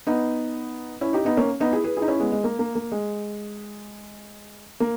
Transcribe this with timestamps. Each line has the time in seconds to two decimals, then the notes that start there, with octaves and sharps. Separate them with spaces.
0.07 B3 D#4
1.01 C#4 E4
1.13 D#4 G4
1.25 B3 D#4
1.37 A#3 C#4
1.60 B3 D#4
1.72 E4 G#4
1.84 G#4 B4
1.97 E4 G#4
2.02 D#4
2.08 C#4 E4
2.20 G#3 B3
2.32 G#3
2.44 A#3
2.59 A#3
2.75 A#3
2.92 G#3
4.80 A#3